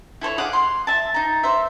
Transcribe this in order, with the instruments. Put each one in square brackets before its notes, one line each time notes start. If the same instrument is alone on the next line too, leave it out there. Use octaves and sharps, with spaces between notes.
[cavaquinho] E4 A4 C5 C#5
G#4 F5 F#5 D6
C6
E5 A5
D#4 A#5
C5 E5